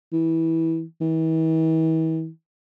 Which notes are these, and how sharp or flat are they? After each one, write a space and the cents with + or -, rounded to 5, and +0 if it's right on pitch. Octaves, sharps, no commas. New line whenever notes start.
E3 -20
E3 -40